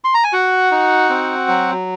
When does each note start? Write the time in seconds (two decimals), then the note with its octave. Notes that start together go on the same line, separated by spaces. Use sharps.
0.04 C6
0.14 A#5
0.24 G#5
0.33 F#4 F#5
0.71 D#4
1.10 C4
1.48 F#3